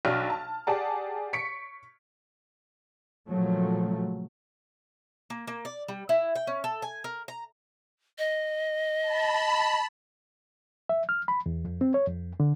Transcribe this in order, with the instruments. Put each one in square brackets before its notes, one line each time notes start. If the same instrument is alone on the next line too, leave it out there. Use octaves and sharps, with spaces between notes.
[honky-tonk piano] B1 D4 F#4 F6
A5
G4 G#4 D5 F#5 A5
C#6 B6 C#7 D7
[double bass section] A#2 C#3 F3 F#3 A3
[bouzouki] A#3
A#3
D5
G3
E4
G5
C#4
A4
G#5
A#4
A#5
[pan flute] D#5
[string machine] A5 B5
[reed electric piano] E5
F6
B5
E2
F2
C4
C#5
F2
D3